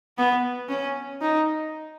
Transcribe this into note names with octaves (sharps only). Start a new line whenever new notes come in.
B3
C#4
D#4